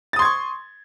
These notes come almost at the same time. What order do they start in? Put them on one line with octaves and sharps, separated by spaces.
A6 D#6 C6 G#6 C#6